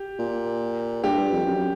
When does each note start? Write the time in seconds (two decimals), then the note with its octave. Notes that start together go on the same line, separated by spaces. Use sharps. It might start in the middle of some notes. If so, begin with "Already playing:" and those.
Already playing: G4
0.19 A#2
1.03 G2 G4
1.18 G2
1.32 F2
1.46 F#2